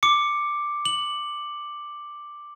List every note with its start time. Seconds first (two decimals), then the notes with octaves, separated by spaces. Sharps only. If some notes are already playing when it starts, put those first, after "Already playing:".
0.03 D6 C#7
0.85 F#7